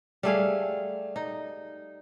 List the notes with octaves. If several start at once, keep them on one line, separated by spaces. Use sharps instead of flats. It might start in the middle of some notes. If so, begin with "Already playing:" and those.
G3 A3 G#4 F5
D#4